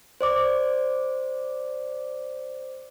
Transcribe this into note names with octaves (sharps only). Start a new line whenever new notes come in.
C5 D5 D6